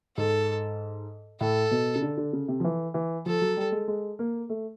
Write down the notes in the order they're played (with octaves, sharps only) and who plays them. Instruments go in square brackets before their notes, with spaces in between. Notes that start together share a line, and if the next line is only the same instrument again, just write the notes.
[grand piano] G#2 [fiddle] A4
[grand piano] A2 [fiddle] A4
[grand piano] B2
C#3
D3
D3
C#3
C3
F3
E3
E3
[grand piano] F3 [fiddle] A4
[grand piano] F#3
G3
G#3
G#3
A#3
A3